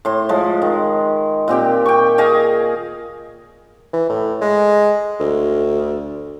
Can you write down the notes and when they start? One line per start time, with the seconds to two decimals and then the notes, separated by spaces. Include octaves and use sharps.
0.05 A2 C6
0.29 F3 G#3
0.62 D#3
1.48 A#2 C4 G4 G5
1.86 G5 C#6
2.18 G#4 D#5 F5 G#5
3.93 E3
4.10 A2
4.41 G#3
5.20 D2